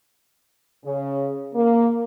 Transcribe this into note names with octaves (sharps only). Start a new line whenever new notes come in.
C#3
A#3